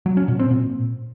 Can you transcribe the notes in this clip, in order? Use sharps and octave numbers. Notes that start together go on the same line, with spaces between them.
F#3
C#4
A#2
C4
A#2